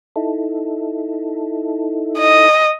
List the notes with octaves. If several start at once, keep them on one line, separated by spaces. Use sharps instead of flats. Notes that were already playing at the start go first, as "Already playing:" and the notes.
D#4 E4 A4
D#5